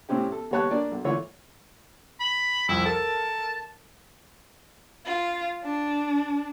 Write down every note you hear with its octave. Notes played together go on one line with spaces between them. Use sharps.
A2 C3 C4 C#4 G4
A4
D#2 G3 B3 C#5 A5 F#6
A#3 D4 D5
B1
D3 E3 A3 D4 F4 C#5
B5
C2 F2 E4
A4 A#4 A5
F4
D4